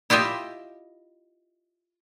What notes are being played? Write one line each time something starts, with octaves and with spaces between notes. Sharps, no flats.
E4 F4 G4 D#5 E5